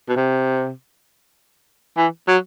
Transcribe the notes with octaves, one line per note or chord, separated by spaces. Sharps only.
B2
C3
E3
F#3